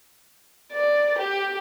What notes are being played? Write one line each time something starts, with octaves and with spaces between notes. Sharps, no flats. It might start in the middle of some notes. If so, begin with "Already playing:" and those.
D5
G4